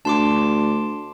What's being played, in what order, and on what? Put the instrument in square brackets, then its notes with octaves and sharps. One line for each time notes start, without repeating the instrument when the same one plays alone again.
[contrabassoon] D2 [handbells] A5 C6 D6